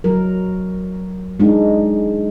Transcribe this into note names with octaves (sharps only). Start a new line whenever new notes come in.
F#3 A#4
G#3 D4 D#4